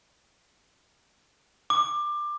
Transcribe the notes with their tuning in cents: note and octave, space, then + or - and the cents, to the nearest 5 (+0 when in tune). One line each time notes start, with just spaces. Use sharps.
D6 +20